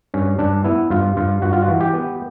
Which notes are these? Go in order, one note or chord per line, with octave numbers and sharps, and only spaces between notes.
G2 C#4
G2 D4
B3 E4
G2 F4
G2 F4
G2 F#4
F4
F#4
E3
G4
B3